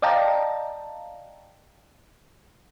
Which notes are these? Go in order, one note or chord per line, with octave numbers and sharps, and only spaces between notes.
D5 D#5 F5 G5 A5 A#5